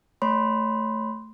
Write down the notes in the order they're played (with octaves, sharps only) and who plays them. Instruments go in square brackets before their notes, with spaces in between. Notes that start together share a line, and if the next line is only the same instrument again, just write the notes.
[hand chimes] A3 C#5 B5 C6